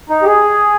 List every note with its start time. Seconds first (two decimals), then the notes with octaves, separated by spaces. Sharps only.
0.10 D#4
0.22 G4
0.26 G#4